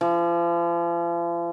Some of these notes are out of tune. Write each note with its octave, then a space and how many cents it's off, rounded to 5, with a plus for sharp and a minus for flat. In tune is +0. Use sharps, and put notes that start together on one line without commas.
F3 -40